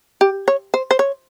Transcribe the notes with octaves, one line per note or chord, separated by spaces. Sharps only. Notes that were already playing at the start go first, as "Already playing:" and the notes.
G4
C#5
C5
C5
C#5